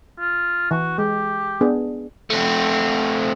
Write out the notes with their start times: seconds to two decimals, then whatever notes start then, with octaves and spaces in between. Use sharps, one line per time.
0.19 F4
0.71 E3 F#4
0.98 G#3 G4
1.61 B3 D4 G#4
2.30 A3 C4